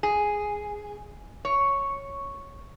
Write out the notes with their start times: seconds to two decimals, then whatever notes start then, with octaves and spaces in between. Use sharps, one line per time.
0.03 G#4
1.45 C#5